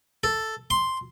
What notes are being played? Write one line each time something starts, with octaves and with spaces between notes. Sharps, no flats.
A4
C6